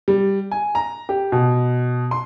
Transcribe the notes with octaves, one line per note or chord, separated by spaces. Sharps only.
G3
G#5
A#5
G4
B2
C6